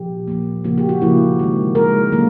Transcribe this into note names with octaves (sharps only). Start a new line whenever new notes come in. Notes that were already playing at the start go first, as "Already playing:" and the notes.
Already playing: A#2 F3 G4
A#2 F3 A#3
C#3 F3 A#3 F#4
G4
F#4
C#3 F3 A#3 E4
D#3 G#3
D#3 G#3 A#4
D3 F#3 A#3